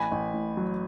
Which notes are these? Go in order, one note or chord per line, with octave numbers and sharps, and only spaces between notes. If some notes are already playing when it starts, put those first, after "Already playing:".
Already playing: A1 G#5 B5
A1
A2
F#3